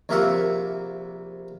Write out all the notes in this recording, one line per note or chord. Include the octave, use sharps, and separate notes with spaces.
A#1 C3 A#3 A#4 E5 F#5